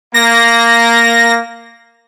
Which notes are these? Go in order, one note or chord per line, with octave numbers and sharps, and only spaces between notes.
A#3 A#6